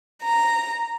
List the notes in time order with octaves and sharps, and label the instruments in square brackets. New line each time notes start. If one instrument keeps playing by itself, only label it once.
[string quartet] A#5